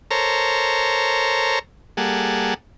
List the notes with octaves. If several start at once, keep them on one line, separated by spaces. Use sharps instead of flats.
A4 A#4 C5 C#5 A#5
G3 A#3 G#4 A4 F#5